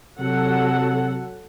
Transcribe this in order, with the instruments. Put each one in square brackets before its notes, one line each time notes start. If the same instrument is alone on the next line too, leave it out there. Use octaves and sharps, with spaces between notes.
[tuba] C3 [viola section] F#3 A4 F#5